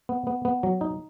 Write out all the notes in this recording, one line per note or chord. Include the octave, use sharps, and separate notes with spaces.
B3
B3
B3
F#3
D#4